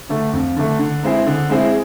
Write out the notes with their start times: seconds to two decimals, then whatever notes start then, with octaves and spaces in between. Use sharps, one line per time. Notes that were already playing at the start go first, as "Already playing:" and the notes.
0.09 D3 A3
0.33 F2
0.56 D3 A3
0.79 D3
1.03 G#3 C4 E4 G#4
1.26 D3
1.50 G#3 C4 E4 G#4